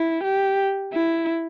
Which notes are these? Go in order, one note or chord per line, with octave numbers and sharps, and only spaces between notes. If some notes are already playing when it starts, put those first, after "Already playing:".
Already playing: E4
G4
E4